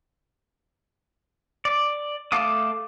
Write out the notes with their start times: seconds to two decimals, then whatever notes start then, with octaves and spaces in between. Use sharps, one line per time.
1.65 D5
2.32 A3 A4 F5 D6 D#6